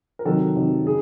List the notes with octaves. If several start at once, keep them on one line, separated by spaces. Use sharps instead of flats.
A#4
C3 D#3 F#3 A4
C3 D#3 F#3
C#3 G#4